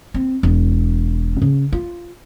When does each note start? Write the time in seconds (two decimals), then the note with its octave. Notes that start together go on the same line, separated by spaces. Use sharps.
0.14 C4
0.43 E1
1.42 C#3
1.72 F4